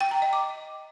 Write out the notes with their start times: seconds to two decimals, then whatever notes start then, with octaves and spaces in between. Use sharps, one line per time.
0.01 G5
0.11 A#5
0.22 D#5
0.33 D6